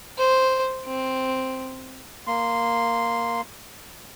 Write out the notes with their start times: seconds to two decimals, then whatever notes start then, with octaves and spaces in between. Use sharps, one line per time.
0.18 C5
0.86 C4
2.27 A#3 C6